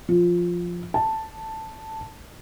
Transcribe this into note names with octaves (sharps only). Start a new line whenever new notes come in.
F3
A5